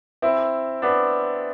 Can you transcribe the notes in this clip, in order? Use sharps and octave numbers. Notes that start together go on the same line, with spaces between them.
C4 E4
B3 D4